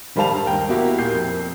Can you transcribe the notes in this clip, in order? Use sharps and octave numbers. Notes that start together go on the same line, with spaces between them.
D#3 G3 C5 F5 A5 F7
G2
D#2 A#4 G5
B2 A#3 E4 F#4 G4
A#2 G6 C7
F2